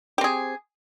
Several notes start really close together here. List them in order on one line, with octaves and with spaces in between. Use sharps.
G4 C4 G#4